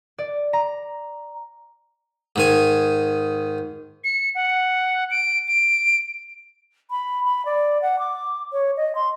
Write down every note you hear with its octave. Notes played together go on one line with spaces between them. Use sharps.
D5
A#5
G#2 D#3 G#5
C#7
F#5
D7
D7
B5
B5
D5
F#5
D6
C#5
D#5
C6